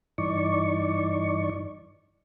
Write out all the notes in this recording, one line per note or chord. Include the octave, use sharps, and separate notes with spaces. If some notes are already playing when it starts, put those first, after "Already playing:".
G2 E3 D#4 D5 C#6